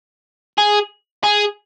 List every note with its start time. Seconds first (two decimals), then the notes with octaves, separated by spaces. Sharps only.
0.58 G#4
1.24 G#4